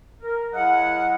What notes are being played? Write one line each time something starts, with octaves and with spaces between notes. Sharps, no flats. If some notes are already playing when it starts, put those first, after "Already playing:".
A#4
F#3 E4 G#4 D#5 F5 F#5